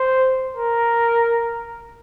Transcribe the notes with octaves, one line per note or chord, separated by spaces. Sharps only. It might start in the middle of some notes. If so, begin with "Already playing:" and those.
Already playing: C5
A#4